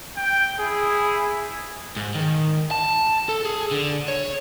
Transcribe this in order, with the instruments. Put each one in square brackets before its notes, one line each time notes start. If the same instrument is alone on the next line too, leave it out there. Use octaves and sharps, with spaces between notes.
[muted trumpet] G5
[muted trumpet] E4 [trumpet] G#4
[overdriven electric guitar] G#2
D#3
A5
A4
G#4
D3
C#5